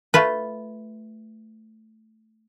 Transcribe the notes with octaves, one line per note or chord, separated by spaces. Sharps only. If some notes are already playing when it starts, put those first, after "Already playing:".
A3 F4 B4